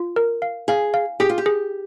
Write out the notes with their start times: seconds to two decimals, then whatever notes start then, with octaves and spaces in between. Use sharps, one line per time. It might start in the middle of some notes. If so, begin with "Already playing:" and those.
Already playing: F4
0.16 A#4
0.42 F5
0.68 G#4 F5
0.94 F5
1.20 G4 G#4
1.29 F4
1.38 G4
1.46 G#4